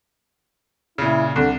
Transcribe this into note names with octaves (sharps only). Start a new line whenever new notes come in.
A#2 C#3 E4
C2 D3